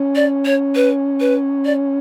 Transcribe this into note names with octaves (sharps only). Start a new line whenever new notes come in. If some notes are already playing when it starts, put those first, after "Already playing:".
Already playing: C#4
D5
C#5
B4
B4
D5